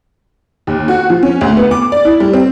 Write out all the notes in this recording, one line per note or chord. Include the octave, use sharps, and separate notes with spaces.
D#2
F#4
F3
C#4
D2
B3
D6
D5
E4
G3
C4